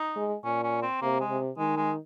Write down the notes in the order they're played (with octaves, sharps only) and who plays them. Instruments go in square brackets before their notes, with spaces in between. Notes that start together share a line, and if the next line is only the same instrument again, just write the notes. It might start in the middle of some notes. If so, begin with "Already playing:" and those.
Already playing: [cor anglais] D#4
[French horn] G#3
[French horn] A#2 [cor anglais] C#4
[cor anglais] C#4
C4
[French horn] C3 [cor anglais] A#3
[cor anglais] G#3
[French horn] C3
[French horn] D#3 [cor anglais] G#3
[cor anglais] G#3